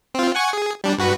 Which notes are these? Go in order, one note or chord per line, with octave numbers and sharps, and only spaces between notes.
C4 F4
F#5 G#5 C#6
G#4
G3 D4
G2 F#4 B4